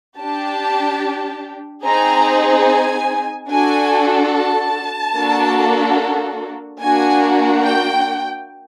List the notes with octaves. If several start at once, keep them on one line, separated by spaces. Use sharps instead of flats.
D4 G4 A5
C4 D#4 G#4 A#5
G#5
D4 F#4 A4 G#5
A5
A#3 D4 F#4 A4
A#3 D4 F#4 G#5
G5